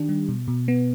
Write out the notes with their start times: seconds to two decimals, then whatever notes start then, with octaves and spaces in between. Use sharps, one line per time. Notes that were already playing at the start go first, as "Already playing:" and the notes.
Already playing: D#3 D4 G4
0.09 G3
0.29 B2
0.48 B2
0.68 B3